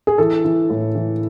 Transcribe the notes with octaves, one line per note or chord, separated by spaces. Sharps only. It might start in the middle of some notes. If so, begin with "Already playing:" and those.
G#4
E3 A4
E3
A2
E3